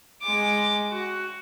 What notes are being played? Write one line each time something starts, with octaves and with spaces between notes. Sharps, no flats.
G#3 D6
F#4